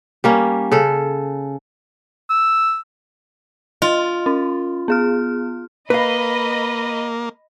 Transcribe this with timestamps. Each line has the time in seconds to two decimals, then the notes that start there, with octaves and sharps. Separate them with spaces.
0.24 G3 A#3 C#4
0.72 C#3 A4
2.30 E6
3.82 F4 D#5
4.26 C#4
4.88 B3 G#4 F6
5.90 A#3 B4 D#5 F5 B5